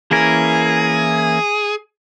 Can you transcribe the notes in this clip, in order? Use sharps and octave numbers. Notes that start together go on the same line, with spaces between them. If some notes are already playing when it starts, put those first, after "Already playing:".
E3 A#3 C#4 E4 G#4 A#4